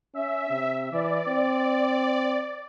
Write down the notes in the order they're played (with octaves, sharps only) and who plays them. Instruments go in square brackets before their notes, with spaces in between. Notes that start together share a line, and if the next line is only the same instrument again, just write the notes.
[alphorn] C#4 [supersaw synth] E5
[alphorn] C3
[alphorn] E3 [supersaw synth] D5
[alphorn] C4